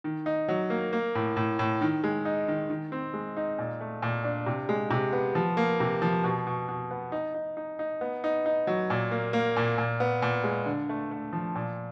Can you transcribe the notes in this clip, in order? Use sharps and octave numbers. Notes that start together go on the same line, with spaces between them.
D#3
D#4
F#3
A#3
A#3
A2
A2
A2
D#3
G#3
D#4
D#3
D#3
C4
G#3
D#4
A#2
A3
A#2
D4
C3
G#3
C3
B3
F3
A#3
C3
F3
B2
B2
B2
B3
D#4
D#4
D#4
D#4
B3
D#4
D#4
F#3
A#2
A#3
A#3
A#2
A#2
B3
A#2
G#3
D3
A3
A3
F3
A#2